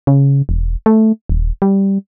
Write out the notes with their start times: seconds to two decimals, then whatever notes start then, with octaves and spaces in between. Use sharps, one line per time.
0.07 C#3
0.49 E1
0.86 A3
1.29 D#1
1.62 G3